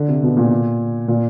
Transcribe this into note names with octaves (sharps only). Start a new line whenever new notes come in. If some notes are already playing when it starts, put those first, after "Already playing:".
Already playing: D3
C3
B2
A#2
A#2